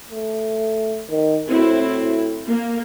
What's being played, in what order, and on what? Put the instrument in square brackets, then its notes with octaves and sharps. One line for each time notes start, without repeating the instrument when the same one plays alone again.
[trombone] A3
D#3
[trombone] A2 [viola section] C4 E4 F#4
[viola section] A#3